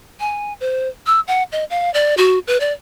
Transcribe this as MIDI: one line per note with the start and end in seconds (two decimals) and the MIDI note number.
0.20 0.53 80
0.60 0.88 72
1.07 1.20 88
1.28 1.43 78
1.52 1.64 75
1.70 1.92 77
1.94 2.17 74
2.17 2.39 66
2.47 2.60 71
2.60 2.72 74